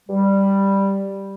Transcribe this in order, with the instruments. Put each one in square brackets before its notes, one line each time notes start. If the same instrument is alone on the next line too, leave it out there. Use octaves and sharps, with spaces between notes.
[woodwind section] G3